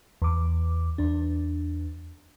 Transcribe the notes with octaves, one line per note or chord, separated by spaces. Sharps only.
E2 D6
E2 D4